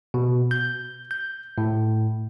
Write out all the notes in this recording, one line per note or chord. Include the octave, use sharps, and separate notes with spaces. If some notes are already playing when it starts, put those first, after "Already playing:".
B2
G6
G6
A2